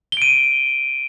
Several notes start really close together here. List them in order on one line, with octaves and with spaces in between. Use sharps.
G7 D7 D#7